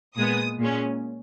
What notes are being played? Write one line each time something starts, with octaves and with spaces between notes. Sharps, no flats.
A#2 G#3 B3 D#6
A#2 G#3 C#4